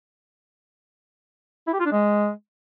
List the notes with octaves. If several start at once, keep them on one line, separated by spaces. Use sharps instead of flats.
E4
G4
F4
D4
G#3